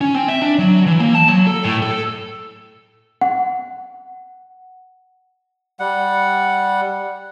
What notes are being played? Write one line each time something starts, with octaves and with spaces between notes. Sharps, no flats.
C#4
C4
E5
D4
F#3
E3
A#3
A5
F#3
A4
A2
A4
F#5
G3 F#5